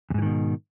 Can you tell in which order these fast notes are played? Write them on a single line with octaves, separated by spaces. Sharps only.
E2 G#2 E3 D#3 B2